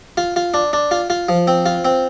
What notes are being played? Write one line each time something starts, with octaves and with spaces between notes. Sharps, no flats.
F4
F4
D4
D4
F4
F4
F3
C4
F4
C4